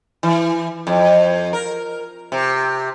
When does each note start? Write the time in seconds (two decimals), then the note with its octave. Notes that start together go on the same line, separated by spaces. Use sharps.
0.23 E3
0.87 F2
1.53 A#4
2.32 C3